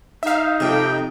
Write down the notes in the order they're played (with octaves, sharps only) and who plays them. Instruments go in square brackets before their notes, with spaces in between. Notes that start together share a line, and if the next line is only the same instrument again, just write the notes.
[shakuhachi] D#4 [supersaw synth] E5 F5
[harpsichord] F2 C3 [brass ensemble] G4 A4 G5